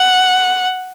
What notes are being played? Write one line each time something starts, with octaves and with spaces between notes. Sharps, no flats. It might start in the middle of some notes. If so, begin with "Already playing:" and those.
Already playing: F#5